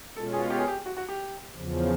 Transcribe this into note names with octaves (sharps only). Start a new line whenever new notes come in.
B2 G#3 C#4 F4 A4
G#4
G4
G#4
G4
F#4
F#4
G4
E2 C#3 F3